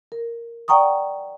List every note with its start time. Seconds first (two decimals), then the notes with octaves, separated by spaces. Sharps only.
0.12 A#4
0.68 D5 F#5 G5 A#5 C#6 D#6